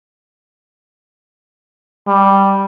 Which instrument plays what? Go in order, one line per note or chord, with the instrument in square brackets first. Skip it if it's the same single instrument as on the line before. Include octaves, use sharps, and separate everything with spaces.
[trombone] G3